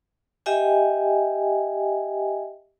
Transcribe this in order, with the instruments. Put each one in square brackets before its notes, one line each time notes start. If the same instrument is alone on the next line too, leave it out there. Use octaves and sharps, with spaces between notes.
[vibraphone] G4 D#5 E5 G5 G#5